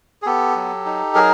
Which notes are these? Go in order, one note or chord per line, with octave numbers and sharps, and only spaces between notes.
G#4
B3 G4 A4
F#3
D#4
F#3 G#4 A#4